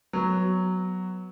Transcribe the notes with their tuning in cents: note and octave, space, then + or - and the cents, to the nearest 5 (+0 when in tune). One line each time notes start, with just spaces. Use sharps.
F#3 +0 B3 +0